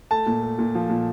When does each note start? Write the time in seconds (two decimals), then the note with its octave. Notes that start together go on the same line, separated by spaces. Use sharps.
0.11 A3 A5
0.26 A#2
0.43 A3
0.59 A#2
0.75 F3
0.90 A#2